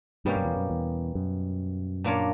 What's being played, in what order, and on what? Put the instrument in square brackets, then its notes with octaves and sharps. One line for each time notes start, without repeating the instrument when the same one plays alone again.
[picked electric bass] G2 [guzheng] B2 G3 A#3 C#4 G4
[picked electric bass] F#2
E2
F#2
E2
F#2
[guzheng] A#2 A#3 D4 A#4 C#5